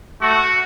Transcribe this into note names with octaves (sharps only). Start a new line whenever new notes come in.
A3 F#4